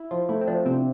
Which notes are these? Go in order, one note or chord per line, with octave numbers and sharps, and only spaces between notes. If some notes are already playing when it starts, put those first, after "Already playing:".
Already playing: E4
F3 F4
A3 E4
C4
F3 D4
C3 C4